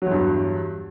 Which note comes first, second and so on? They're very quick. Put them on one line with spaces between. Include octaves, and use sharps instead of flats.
F#3 E2 G2